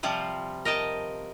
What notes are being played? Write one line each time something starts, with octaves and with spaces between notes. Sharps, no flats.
C3 F3 G3 F4 C5
A#4 D#5 G5 A5